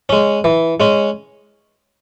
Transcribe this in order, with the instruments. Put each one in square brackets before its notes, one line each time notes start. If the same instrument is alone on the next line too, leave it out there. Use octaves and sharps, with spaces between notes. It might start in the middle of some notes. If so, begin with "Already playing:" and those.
[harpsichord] G#3 C#4
E3
G#3 C#4